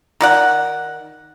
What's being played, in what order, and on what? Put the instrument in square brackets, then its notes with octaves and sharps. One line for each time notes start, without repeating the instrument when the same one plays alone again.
[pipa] D#3 D5 F#5